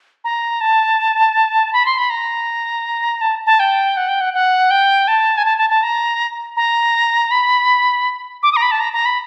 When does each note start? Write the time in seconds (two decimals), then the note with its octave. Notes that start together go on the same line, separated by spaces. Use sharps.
0.24 A#5
0.61 A5
1.73 B5
1.86 C6
1.98 B5
2.10 A#5
3.21 A5
3.46 A5
3.60 G5
3.97 F#5
4.08 G5
4.21 F#5
4.34 F#5
4.70 G5
5.08 A5
5.37 G#5
5.45 A5
5.58 A5
5.70 A5
5.83 A#5
6.57 A#5
7.31 B5
8.43 D6
8.52 D#6
8.56 A#5
8.62 B5
8.71 A5
8.80 A#5
8.93 A#5
9.05 B5